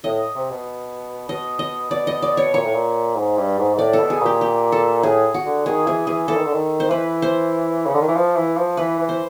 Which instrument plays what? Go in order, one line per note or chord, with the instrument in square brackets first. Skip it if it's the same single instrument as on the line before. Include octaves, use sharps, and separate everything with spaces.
[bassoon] A2 [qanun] D#5
[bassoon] C3
B2
[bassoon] B2 [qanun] D#5
[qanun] D#5
[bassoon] B2 [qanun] D5
[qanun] D#5
D5
C#5
[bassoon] A#2 [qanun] C#5
[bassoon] A2
A#2
G#2
G2
G#2
G#2
[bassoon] A2 [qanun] D5
[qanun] A4
[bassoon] B2
[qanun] G#4
[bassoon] A#2
[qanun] G4
G4
A4
[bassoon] A2 [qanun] G#4
[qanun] F#4
[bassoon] D3
[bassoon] D#3 [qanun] G#4
[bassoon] E3 [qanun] G#4
[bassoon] E3 [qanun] G#4
[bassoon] E3 [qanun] A4
[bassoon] D#3
D3
D#3
[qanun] C5
[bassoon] E3 [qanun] B4
[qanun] C5
[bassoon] C#3
D3
D#3
E3
F3
E3
F3
[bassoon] E3 [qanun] B4
[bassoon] E3
[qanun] C5